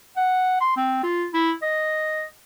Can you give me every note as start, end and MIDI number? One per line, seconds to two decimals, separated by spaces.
0.17 0.59 78
0.61 0.74 84
0.77 0.99 60
1.03 1.26 65
1.34 1.52 64
1.62 2.24 75